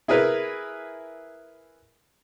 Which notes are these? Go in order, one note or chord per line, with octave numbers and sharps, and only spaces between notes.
E4 G#4 A#4 B4